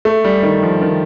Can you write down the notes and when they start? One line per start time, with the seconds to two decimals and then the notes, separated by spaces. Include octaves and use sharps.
0.05 A3
0.25 G3
0.43 D#3
0.63 F3
0.81 D#3